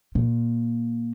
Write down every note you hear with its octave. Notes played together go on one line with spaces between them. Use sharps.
A#2